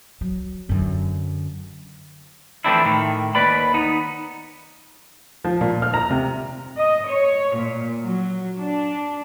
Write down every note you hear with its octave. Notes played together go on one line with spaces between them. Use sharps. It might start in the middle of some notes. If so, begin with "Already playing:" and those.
F#3
F#2 D3
E3 F3 A3 C4 D4 E4
A2 D#3
D#2 B4 D5 B5
B3 D#4
F3
A#2
F6
A#5
C3
D#5
C#5
A#2
F#3
D4